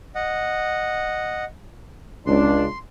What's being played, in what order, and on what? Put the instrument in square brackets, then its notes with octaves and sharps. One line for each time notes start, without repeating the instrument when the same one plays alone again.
[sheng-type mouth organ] D#5 F#5
[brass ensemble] C#2 D4 [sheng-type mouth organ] C6